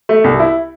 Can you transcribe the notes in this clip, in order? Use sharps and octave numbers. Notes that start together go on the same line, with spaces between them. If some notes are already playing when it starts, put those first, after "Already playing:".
A3
C2
E4